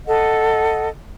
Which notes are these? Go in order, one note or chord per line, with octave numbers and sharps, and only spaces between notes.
A4 D#5 F#5